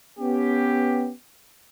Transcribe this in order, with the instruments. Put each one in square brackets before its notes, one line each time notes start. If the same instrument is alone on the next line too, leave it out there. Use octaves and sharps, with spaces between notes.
[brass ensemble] B3 C#4 G4